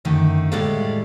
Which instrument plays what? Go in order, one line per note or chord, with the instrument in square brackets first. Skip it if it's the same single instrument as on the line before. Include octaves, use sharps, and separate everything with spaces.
[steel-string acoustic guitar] F#2 D3 D#3 A3
A2 G3 G#3 A4 D5 F5